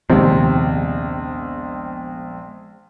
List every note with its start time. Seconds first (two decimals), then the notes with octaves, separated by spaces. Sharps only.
0.10 A#1 D#2 C3 G#3 B3 C4